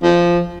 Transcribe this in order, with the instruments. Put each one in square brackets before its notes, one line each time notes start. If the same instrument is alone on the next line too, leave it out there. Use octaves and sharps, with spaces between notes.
[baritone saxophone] F3